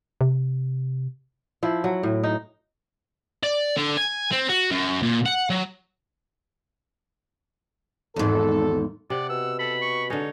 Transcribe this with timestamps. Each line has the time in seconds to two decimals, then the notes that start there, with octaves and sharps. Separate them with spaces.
0.21 C3
1.63 F3 E4
1.84 F#3
2.03 A2
2.23 D#4
3.43 D5
3.77 D3
3.97 G#5
4.32 C4
4.49 F#4
4.71 F#2
5.03 A#2
5.26 F#5
5.50 F#3
8.16 G#1 E2 G#2 A4
9.10 C3 D5 F#5
9.29 B2 E6
9.59 A4 B5
9.82 C#6
10.10 D3 G#3 D#4 C#5